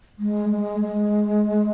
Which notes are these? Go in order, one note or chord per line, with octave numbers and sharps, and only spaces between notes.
G#3
G#3
G#3